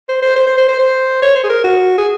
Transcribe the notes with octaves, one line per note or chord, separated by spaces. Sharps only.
C5
C5
C5
C5
C5
C5
C5
C#5
C5
G#4
A#4
F#4
G#4